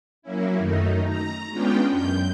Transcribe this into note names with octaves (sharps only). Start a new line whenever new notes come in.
F#3 A#3 C#4 E4
F#2 D#3 A3 D#4
A#5
G#3 B3 C#4 D4 F4 G5
F#2 G6